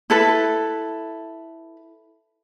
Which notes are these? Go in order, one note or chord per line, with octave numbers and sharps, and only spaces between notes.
E4 A4 B4